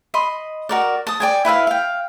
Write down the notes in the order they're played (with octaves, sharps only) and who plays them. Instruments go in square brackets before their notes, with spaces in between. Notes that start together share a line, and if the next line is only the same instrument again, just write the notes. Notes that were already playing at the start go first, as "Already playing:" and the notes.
[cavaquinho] D#5 B5 C6
F#4 A#4 D5
A5 D#6
D5 G5 G#5
E4 B4 E5 F5
F5 G5